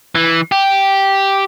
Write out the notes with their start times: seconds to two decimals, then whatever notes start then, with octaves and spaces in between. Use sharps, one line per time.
0.15 E3
0.52 G4